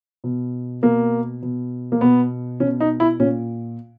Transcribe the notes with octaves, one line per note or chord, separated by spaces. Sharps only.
B2
B2 A#3
B2
A#3
B2 B3
B2 C#4
D#4
E4
A#2 C#4